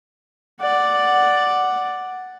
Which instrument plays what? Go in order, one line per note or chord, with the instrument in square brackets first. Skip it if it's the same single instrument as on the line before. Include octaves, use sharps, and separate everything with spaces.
[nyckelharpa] D5 F#5